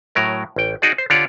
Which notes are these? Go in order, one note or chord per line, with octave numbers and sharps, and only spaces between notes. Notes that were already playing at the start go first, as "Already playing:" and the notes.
A2 F#3 A#4
A1 G5
D#4 F#4 G#4 D5
C5
D3 D4 F4 G4 C#5 D5